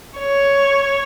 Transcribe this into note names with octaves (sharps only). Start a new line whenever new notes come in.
C#5